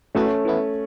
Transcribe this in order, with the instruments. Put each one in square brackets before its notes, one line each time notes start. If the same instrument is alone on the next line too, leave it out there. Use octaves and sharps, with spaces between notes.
[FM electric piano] A2 F#3 B3 F#4 [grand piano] A3 C#4
[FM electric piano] E3 B3 E4